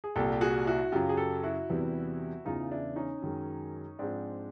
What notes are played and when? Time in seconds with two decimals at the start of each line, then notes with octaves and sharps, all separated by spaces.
0.04 G#4
0.16 C2 A#2 G3 G4 A4
0.32 G4
0.41 F#4 G#4
0.67 E4 F#4
0.92 F#2 C#3 F#3 F4 G4
1.09 G#4
1.17 G4 A4
1.43 E4 F#4
1.70 E2 C3 E3 G3
2.45 E2 C#3 E3 D#4 F4
2.71 D4 E4
2.96 C#4 D#4
3.22 F#2 D#3 G#3
3.99 G#2 F3 G#3 C4 D4